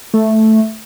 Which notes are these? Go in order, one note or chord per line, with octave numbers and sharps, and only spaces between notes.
A3